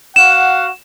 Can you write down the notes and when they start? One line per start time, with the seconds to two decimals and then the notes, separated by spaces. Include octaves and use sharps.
0.16 F#4 F5 F#5 E7